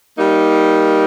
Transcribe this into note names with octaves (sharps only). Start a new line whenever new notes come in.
G3 A#3 D#4